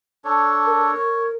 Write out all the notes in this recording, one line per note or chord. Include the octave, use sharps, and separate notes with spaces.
D4 A4 C#5
A#4
C#5